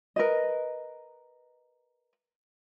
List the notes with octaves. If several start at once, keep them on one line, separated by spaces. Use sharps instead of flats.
A#4 B4 D#5